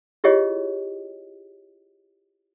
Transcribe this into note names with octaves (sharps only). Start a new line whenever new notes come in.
E4 F4 G4 G#4 C#5 D#5